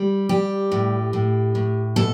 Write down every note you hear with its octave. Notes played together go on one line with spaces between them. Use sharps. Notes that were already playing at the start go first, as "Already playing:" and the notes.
Already playing: G3
G3 G4
A2
A2
A2
B2 A4